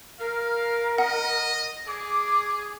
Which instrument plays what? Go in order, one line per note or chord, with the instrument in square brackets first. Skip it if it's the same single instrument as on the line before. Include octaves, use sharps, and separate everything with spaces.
[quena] A#4 [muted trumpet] F5
[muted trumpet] D#5 [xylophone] F#5
[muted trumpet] G#4 [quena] D6